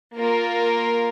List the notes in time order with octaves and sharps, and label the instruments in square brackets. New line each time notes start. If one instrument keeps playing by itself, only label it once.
[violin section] A#3 F4 A#4